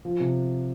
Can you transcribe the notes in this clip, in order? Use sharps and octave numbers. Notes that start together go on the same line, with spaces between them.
F3
C3